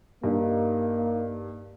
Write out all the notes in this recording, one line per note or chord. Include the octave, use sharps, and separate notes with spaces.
G2 A#3 D#4